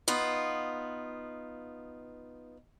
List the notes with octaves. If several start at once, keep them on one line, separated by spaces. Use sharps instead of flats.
B3 D#4 F4